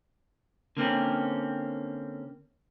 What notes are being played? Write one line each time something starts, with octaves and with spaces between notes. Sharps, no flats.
D3 A#3 C4 C#4